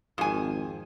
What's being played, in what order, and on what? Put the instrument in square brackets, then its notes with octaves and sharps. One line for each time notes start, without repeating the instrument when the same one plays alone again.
[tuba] G#1 [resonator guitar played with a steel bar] F2 G#5